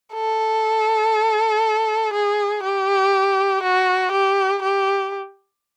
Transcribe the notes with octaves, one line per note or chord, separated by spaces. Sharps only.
A4
G#4
G4
F#4
G4
G4